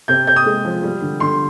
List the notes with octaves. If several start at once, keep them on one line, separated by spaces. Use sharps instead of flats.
C3 G6
C3 G6
D#6
G#3
F3
G3
D3
D3 C6